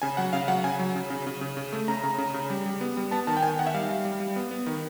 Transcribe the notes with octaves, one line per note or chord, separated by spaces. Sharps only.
C#3 G#5
F#3 F#5
C#3 F5
F#3 F#5
C#3 G#5
F#3
C#3
C#3
C#3
C#3
C#3
A3
C#3 A#5
C#3
C#3
C#3
G3
G3
B3
G3
B3 A5
D#3 A5
G5
D#3 G#5
D#3 F#5
E5
G3 F5
G3
G3
G3
B3
B3
D#3